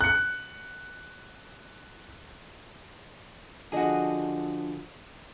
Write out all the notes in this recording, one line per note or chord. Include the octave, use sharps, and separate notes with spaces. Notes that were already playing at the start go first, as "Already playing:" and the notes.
F#6 C#7
D3 F3 F#4 G#4 D#5